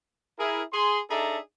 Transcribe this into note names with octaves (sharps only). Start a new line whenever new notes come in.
E4 G#4 A#4
G#4 C6
D4 D#4 G#4 A4 E5 A#5